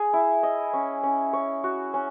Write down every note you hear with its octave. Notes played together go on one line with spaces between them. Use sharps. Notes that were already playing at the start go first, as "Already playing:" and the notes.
Already playing: G#4
E4
D#5
C#4
C#4
C#5
F#4
C#4